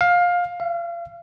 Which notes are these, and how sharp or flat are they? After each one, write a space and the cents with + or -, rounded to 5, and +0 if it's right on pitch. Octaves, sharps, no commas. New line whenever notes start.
F5 +20
F5 -35